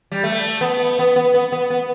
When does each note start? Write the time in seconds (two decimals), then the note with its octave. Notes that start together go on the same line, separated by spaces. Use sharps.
0.12 G3
0.24 A3
0.61 B3
0.99 B3
1.16 B3
1.34 B3
1.52 B3
1.70 B3